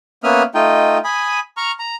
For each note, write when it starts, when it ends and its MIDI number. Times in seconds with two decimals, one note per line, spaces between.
0.24 0.43 58
0.24 0.43 59
0.24 0.43 61
0.24 0.43 76
0.24 0.43 87
0.24 0.43 89
0.55 0.97 57
0.55 0.97 63
0.55 0.97 65
0.55 0.97 75
0.55 0.97 79
1.04 1.39 80
1.04 1.39 83
1.04 1.39 87
1.57 1.71 82
1.57 1.71 85
1.57 1.71 89
1.79 1.95 82